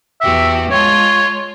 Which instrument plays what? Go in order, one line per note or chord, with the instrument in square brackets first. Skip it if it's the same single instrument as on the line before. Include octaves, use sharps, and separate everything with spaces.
[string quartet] E2 F#4 G4 [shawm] E5
[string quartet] G#3 F4 A5 [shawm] C#5